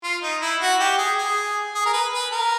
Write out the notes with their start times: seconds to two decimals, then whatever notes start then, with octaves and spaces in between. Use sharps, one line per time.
0.03 F4
0.23 D#4
0.41 E4
0.61 F#4
0.80 G4
0.98 G#4
1.18 G#4
1.75 G#4
1.86 A#4
1.93 B4
2.13 B4
2.32 A#4